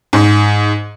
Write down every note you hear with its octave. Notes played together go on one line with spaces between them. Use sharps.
G#2